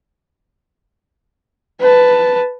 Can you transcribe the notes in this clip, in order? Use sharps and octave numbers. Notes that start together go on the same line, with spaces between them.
B4 A5